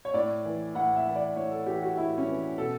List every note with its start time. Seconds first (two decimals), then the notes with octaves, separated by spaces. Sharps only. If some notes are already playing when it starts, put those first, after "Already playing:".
0.05 C#5
0.14 A2 D5
0.45 E3
0.75 A2 F#5
0.96 E5
1.06 E3
1.16 D5
1.36 A2 C#5
1.51 A4
1.66 E3 G4
1.82 F#4
1.97 A2 E4
2.18 C#4
2.28 E3
2.58 B2 A4